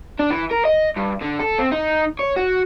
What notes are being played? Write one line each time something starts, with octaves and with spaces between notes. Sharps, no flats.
D4
E3
A#4
D#5
G2
D3
A4
C4
D#4
C#5
F#4